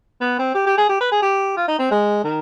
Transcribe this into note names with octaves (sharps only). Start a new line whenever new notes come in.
B3
C4
G4
G4
G#4
G4
B4
G#4
G4
F4
D#4
C4
G#3
D#3